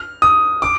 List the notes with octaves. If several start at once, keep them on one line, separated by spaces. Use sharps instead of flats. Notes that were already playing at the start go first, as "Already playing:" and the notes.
Already playing: F6
D#6
D6